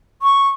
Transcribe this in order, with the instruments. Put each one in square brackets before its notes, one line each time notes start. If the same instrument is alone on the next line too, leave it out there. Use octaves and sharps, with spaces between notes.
[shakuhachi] C#6